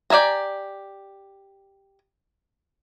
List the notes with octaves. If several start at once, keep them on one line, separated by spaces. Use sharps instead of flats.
G4 D5 E5 G#5 A#5